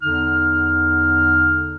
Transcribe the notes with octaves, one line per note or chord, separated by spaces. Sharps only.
E2 D3 D#4 F6